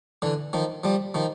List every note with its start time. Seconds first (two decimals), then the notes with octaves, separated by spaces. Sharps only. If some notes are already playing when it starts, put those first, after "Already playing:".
0.22 D3 E3
0.53 D#3 F3
0.84 F3 G3
1.14 D#3 F3